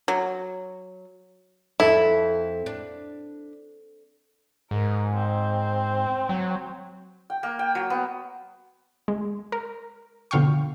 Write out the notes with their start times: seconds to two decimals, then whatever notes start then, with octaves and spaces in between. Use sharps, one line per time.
0.08 F#3
1.80 F2 E4 A4
2.66 D4
4.71 G#2 A#4
5.14 C4
6.29 F#3
7.30 G5
7.43 A#3
7.59 G5
7.75 F#3
7.90 B3
9.08 G#3
9.52 A#4
10.31 B2 D3 F3 F5 G5 C#6